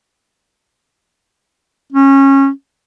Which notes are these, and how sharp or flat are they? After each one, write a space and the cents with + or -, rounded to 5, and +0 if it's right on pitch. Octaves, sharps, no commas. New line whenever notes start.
C#4 -20